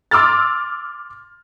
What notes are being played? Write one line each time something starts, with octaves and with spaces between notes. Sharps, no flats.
C6 D6 E6 F6 A6